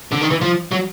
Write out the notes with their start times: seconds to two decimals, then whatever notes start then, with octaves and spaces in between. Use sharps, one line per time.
0.12 D3
0.21 D#3
0.30 E3
0.41 F3
0.72 F#3